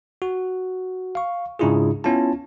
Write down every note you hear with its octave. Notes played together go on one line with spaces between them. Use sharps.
F#4
F5 C#6
G#2 C#3 D4 E4 F4 G#4
B3 C#4 E4 F4 A5